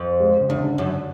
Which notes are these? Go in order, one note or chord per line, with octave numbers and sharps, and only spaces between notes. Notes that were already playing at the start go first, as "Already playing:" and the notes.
Already playing: F2
G#2 G#3
C#3 C#4
E2 D3 D4
C#4
D3 D4
D#4
F#2 D3 D4